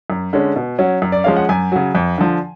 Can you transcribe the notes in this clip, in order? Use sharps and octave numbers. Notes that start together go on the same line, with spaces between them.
F#2
D3 G#3 C#4
B2
F#3 C#4
F#2
D5
F3 G#3 C#4 F5
F#5
F#2 G#5
C#3 F#3
F2
D3 F3